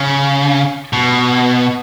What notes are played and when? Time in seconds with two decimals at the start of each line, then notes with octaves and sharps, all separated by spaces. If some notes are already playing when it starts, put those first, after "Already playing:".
Already playing: C#3
0.93 B2